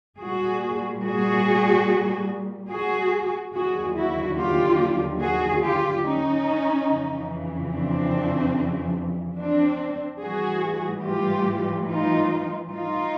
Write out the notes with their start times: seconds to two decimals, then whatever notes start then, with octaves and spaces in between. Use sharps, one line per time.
0.20 A#2 G3 F#4 G#4
1.03 F#4 G#4
2.70 F#4 G#4
3.53 D#2 D3 F#3 F#4 G#4
3.95 E4 F#4
4.37 F4 G4
5.20 F#4 G#4
5.62 F4 G4
6.03 C#4 D#4
6.87 F2 C#3 E3
7.71 C4 D4
9.38 C4 D4
10.21 A2 E3 G3 F#4 G#4
11.04 F4 G4
11.88 D#4 F4
12.72 D#4 F4